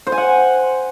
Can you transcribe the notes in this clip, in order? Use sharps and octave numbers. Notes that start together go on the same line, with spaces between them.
C5
G#5
F#5